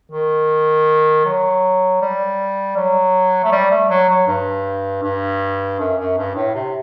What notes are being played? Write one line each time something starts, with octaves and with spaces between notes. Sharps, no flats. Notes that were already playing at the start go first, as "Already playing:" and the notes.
D#3
F#3
G3
F#3
A3
G3
A3
F#3
F#3
G2
G2
F#2
F#2
G2
A2
C3